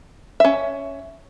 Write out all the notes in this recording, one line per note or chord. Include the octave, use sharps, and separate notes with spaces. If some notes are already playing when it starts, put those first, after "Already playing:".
C#4 E5